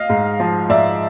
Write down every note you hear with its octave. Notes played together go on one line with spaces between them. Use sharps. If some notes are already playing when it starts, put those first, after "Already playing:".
Already playing: D#5 F5
G#2
F3
G#2 D5 E5